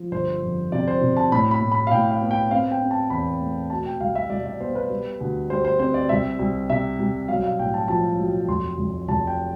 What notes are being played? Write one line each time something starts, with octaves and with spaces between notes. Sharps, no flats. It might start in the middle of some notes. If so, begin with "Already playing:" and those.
Already playing: F3
G1 C5
F2
C3 D5
C5
C3
A5
A2 B5
B5
A2
B5
F5
A2 G5
F5
B3
G5
C4 F5
G5
C4
A5
E2 B5
A3
B2 A5
G5
C2 F5
E5
C2 D5
D5
B3 C5
B4
G3
D2
G3 C5
C5
C4 C5
D5
C2 E5
C2
C3 E5
C2
B1 F5
F5
A2 G5
A5
F3 A5
B1
F1 C6
F1
F1 A5
G5